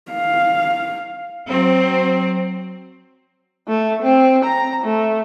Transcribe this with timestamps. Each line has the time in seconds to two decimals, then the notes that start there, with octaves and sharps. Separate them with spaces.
0.12 F5
1.48 F#3 C4
3.68 A3
4.03 C4
4.45 A#5
4.84 A3